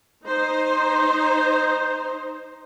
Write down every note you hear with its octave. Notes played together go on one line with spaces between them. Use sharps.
D#4 C5